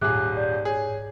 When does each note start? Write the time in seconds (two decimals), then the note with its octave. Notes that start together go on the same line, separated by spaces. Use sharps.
0.01 D#1 G#2 G#4 E5 D6 F#6
0.36 D5 G6
0.65 G#4 C#5